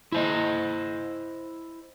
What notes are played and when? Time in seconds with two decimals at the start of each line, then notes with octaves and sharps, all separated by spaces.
0.12 E4 C5 D#5